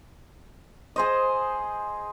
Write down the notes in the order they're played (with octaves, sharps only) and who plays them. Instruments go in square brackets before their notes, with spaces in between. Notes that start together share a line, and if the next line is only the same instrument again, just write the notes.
[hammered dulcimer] G#4 C5 D#5